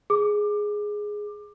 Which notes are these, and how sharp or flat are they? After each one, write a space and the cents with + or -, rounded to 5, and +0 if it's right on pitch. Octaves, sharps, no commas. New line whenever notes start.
G#4 +0 D6 +20